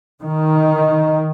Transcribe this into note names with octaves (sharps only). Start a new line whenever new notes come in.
D#3